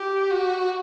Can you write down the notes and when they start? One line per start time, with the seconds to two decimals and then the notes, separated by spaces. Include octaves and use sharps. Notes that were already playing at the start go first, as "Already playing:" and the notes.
Already playing: G4
0.31 F#4